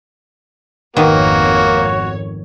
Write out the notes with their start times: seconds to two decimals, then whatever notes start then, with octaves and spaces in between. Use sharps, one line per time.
0.97 G#1 F2 D#3 A#3 B3 F#4 C#5